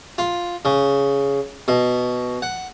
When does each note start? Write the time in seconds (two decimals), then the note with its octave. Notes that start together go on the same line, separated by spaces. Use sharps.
0.18 F4
0.65 C#3
1.68 B2
2.42 F#5